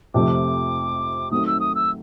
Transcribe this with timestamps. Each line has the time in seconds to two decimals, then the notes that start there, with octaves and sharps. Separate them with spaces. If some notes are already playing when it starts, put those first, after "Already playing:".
0.14 F2 C3 F3 A3 C4 D6
1.31 D#3 F#3 A3 C4 D#6
1.46 E6
1.60 D#6
1.75 E6